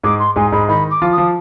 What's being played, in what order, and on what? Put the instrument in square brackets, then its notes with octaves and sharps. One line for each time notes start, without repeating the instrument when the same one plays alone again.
[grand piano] G#2 G#3 [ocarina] D6
[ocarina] C6
[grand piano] G#2 G#3 [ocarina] G#5
[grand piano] G#2 G#3 [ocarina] B5
[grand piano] D#3 D#4 [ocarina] B5
[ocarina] D6
[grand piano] F3 F4
[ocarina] D#6
[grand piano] F3 F4